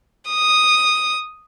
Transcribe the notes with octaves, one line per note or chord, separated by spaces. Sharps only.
D#6